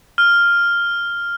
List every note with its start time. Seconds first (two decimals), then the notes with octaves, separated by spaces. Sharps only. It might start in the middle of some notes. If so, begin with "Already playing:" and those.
0.18 F6